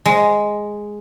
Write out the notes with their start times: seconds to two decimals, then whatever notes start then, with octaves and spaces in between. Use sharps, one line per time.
0.05 G#3